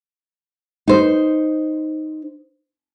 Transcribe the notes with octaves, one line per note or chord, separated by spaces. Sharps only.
D#4 C5